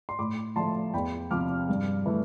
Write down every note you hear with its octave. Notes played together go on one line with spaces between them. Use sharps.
C6
A2 B5 D6
F3 A3 A5 C6
E2 G5 B5
C3 F3 D6 F6
G2
E3 A3